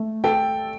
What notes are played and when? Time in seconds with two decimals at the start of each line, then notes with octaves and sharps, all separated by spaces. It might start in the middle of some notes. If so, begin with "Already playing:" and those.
Already playing: A3
0.24 A4 G5